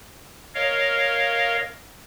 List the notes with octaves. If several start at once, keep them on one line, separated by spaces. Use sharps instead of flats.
A#4 C#5 D#5 F5